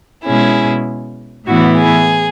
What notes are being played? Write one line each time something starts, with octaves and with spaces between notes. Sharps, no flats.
B2 G#3 C#4 E4 G#4
A2 E3 B3 E4 F#4
G#4